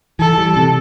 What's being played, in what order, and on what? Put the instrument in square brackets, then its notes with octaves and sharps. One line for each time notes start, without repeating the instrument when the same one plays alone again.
[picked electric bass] E3 [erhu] A4
[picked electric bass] G3
C3